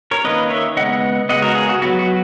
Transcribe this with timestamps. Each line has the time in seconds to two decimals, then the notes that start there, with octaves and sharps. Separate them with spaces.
0.11 A#4 C#5
0.24 D#3 A#3 C#4 B4 D#5
0.50 C#5 E5
0.77 C#3 G#3 B3 D#5 F#5
1.29 C#3 G#3 B3 D#5 F#5
1.42 F#4 A#4
1.55 G#4
1.69 F#4
1.82 F#3 B3 F#4
1.99 F#4